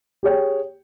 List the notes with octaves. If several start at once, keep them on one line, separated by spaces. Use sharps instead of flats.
G4 G#4 C#5 G5